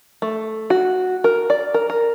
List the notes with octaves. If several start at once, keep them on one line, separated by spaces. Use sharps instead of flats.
A3
F#4
A#4
D5
A#4
A#4